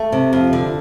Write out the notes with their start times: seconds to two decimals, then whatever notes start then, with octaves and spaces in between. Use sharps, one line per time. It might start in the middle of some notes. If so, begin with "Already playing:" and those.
Already playing: A3
0.12 C3
0.33 F2
0.53 D3